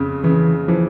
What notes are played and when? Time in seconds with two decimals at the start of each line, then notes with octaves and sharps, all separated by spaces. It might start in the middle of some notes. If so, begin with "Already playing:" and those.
Already playing: F2 C#3
0.24 C#3 E3
0.68 E3 F3